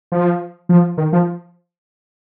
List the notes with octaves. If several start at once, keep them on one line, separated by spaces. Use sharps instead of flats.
F3
F3
D#3
F3